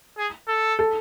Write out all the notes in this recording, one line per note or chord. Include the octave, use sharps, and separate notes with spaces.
G#4
A4
A4